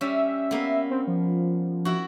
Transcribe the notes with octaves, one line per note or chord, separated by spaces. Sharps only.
G3 C#4 E5
A#3 B3
C4
F3
E4 F#4